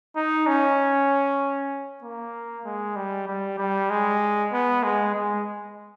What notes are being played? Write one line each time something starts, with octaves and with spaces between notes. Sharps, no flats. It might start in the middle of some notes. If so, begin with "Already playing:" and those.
D#4
C#4
A#3
G#3
G3
G3
G3
G#3
B3
G#3
G#3